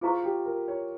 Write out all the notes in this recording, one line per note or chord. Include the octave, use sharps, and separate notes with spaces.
F4 G#4 C5 F5 A#5 C#6
G4
A#4
C#5